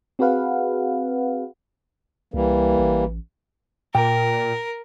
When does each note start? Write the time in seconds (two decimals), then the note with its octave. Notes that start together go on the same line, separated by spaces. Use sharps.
0.19 C4 F#4 G#4 B4 F5 F#5
2.34 C2 E3 G3 A#3
2.79 A1
3.95 A#2 A#4 G5